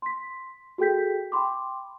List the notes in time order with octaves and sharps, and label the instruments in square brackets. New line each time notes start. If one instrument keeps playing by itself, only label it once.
[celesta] C6 B6
F#4 G#4 A4 G5 G6 B6
G5 B5 C6 D6